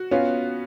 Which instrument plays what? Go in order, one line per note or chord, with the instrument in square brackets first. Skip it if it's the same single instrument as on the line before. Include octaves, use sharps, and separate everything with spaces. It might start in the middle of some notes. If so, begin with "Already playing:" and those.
Already playing: [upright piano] F#4
[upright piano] B3 [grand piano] C#4 F4